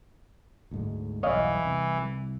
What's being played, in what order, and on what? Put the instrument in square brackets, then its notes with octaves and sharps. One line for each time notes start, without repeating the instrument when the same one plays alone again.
[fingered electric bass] D2 G#2 G#3
[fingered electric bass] B1 E2 G2 [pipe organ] E3 [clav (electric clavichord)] C#5 D#5 F5
[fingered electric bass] C2